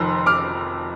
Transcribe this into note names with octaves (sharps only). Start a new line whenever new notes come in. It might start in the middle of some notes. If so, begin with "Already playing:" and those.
Already playing: F1 F2 D#3 C6
D6 F6